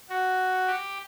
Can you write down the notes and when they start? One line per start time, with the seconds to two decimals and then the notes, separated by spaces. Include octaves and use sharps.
0.09 F#4
0.67 G4